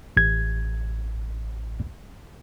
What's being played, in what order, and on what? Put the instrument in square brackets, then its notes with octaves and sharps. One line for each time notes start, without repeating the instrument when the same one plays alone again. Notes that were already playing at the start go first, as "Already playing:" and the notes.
[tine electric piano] A1 G#6